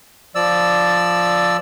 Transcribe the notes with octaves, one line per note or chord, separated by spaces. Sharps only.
F3 D5 E6